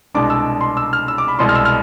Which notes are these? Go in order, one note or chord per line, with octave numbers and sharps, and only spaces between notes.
C2 B2 G#3 D4 D6
E6
C6
E6
F6
E6
D6
B5
C2 B2 G#3 C6
F6
E6
F6